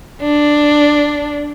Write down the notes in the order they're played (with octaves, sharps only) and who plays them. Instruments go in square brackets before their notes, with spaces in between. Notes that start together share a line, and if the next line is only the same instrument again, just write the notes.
[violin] D4